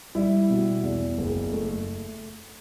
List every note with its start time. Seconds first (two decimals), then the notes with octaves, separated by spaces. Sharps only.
0.15 G3 E4
0.50 B2
0.83 E2
1.18 F#1
1.52 A3